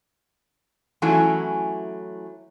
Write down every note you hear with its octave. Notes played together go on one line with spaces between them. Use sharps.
E3 F#3 A3 C#4 E4